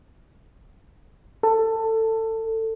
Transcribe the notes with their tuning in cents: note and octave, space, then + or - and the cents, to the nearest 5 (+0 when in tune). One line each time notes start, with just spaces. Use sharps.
A4 +20